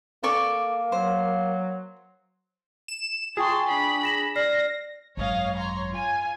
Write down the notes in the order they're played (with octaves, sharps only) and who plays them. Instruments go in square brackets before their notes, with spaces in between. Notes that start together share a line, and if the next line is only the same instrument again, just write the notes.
[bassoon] A#3 [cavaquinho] A4 D5 C#6
[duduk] F#3 [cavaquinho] C5
[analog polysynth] E7
[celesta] F4 G5 C#6 [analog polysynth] G#4 [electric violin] A5 C6
[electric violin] D4 B5
[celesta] A#6 E7 F#7
[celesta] D5 F6 C7 [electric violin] A#6
[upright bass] G#1 F#2 [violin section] C#5 D#5 F5
[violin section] C#5 A#5 C6
F4 G#5